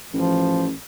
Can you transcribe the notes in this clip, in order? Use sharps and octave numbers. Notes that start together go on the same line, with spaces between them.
A1 F3